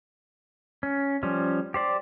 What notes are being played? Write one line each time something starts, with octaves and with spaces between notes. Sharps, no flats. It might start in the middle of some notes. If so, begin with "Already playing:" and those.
C#4
F3 G3 C#4
G4 C5 D5